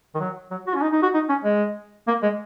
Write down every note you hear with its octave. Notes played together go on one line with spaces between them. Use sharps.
D#3
F#3
F#3
F#4
C#4
D#4
D#4
F#4
D#4
C#4
G#3
A#3
G#3